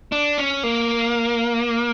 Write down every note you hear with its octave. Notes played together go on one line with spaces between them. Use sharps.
D4
C#4
A#3